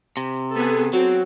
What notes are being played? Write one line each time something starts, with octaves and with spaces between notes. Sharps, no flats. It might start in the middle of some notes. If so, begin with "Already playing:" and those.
C3
B3 G#4 A4
F#3 C4 F#4